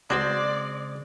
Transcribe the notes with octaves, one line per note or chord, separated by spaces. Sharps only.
C#3 G#3 C4 D4 F#4 B4 C5 D5